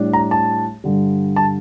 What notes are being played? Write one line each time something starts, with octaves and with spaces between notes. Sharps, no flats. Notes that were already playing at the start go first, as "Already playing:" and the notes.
Already playing: A2 G3 D4
A#5
A5
G2 D3 G3
A5